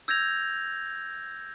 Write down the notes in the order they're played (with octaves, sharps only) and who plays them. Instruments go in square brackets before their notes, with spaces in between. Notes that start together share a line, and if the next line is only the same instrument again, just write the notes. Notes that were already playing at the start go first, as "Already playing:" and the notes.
[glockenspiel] E6 G6 G#6 A#6 F7